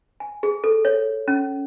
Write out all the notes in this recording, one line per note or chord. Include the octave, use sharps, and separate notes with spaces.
G#5
G#4
A4
C#5
C#4